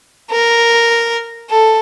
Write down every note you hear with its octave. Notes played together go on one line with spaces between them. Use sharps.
A#4
A4